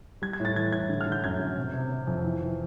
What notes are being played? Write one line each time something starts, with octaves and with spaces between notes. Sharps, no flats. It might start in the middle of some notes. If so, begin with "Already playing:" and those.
G3 G#6
G#6
A2
A6
E3 G#6
A2 G#6
D3
F6
D3
G6
F#2 G#6
D3
C3
C3
C3
F2
E3
E3